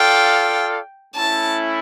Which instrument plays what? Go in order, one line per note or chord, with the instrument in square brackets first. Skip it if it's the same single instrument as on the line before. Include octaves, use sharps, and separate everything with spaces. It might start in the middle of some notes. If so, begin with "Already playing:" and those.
Already playing: [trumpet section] F4 A4 D5 F5 [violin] G5
[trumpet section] A3 C#4 E4 [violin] A5